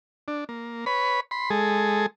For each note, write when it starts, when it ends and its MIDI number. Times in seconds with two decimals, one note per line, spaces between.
0.28 0.44 62
0.49 0.85 58
0.86 1.20 71
0.86 1.20 73
0.86 1.20 83
1.31 1.50 83
1.31 1.50 84
1.50 2.06 56
1.50 2.06 68
1.50 2.06 69